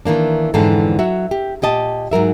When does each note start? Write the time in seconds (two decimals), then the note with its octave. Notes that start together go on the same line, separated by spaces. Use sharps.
0.05 D#3 E3 A#3 D4
0.54 F2 G#2 D3 E3 C4 A4
0.99 F#3 F#4 E5
1.31 G4
1.62 A#2 G4 D#5 A5
2.11 G#2 F#3 A#4 E5